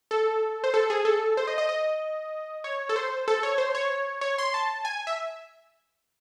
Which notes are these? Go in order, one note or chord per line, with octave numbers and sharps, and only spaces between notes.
A4
C5
A4
G#4
A4
C5
D#5
D#5
D#5
C#5
A4
C5
A4
C#5
C5
C#5
C#5
C6
A5
G#5
E5